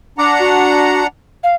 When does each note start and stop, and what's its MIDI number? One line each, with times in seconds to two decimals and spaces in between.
0.18 1.07 62
0.18 1.07 78
0.18 1.07 82
0.18 0.34 86
0.39 1.03 66
1.44 1.55 77